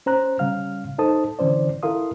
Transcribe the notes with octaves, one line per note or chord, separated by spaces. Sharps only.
C#4 C5 A#5 F#6
C#3 G3 C#4 F5 F6
D#4 A4 C5 A5 D#6
D3 E3 C#4 C5 D5
E4 A4 A#4 F5 C6 D#6